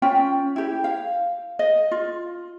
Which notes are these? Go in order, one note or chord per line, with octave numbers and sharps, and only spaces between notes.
C#4 F4 G5
E4 G4
F5
D#5
F4